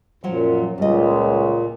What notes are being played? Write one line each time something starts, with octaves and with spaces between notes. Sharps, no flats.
F#2 A#2 F3 F#3 F#4
C#2 A#2 G3 D#5